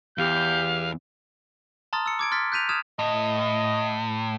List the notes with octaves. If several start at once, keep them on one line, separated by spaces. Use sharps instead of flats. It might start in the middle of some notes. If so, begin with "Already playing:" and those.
E2 G4 F5 G6
A5 A#5 C6 D#6 F6 A6
E6 C#7
D6 G#6 D7
C6 F6 A6 B6
F#6 G6 B6 D#7 F7
D#6 F6 G#6 E7
A2 D#5